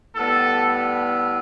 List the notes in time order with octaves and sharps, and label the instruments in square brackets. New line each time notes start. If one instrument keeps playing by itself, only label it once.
[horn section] A2 G3 B3 A4